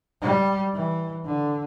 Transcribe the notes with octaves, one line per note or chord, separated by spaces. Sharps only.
G3
E3
D3